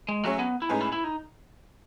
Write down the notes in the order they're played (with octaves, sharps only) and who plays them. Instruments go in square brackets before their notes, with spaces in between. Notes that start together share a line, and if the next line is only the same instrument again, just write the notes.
[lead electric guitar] G#3
[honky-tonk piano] F#3 C#4 G#4 C#5 [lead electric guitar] A3
[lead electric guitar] B3
E4
[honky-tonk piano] A2 G#3 C#4 G#4 B4 [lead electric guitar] D#4
[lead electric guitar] E4
E4
D#4